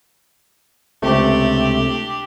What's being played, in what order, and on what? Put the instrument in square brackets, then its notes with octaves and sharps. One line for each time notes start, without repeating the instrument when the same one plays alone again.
[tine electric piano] C#2 C3 A3 [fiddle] D4 G4